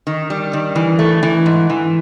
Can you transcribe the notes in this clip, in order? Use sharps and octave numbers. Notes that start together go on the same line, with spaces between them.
D#3
G3
D#3
E3
A3
E3
G#2
E3